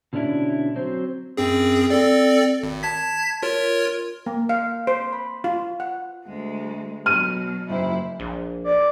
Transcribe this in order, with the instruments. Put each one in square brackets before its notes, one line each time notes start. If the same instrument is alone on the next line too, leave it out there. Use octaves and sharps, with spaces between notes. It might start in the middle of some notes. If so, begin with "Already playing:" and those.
[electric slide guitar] B2 D3 C#4 D4 E4
F#3 C4 C5
[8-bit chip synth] F#2 C4 G#4
C4 A4 D5
G#1
A5 G#6 B6
F4 A#4 C#5
[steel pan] A#3
F5
C5
B5
F4
F#5
[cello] D2 G#3
[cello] B2 F#3 [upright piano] F6 D#7
[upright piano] F#1 [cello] E4 C5
[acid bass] A#1
[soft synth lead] D5